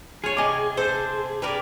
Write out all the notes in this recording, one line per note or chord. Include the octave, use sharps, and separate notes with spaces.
F4 G#4 C#5
C3 D#5 G#5 D6
A4 C5
G3 A#4 B4 D5